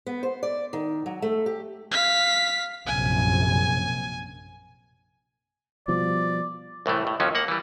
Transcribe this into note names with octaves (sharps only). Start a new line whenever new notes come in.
B3
C5
D5
D#3
F#3
A3
G4
F5 B6
A#1 F#2 C3 G#5
B2 F3 G3 D5
C2 A2 E3 A3
A2
D#2 F3 F#3 C#4
A#3 F#5
E3 G3